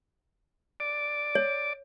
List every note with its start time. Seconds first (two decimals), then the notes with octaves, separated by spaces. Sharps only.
0.80 D5
1.35 C#5